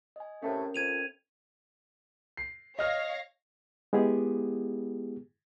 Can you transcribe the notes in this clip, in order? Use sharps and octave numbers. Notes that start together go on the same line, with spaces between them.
D#5 G#5
A2 C3 A3 C#4 A#4
F2 G#6 D#7 F7
C7
C#5 D#5 F5 F6 A#6
G#3 B3 E4 G4 G#4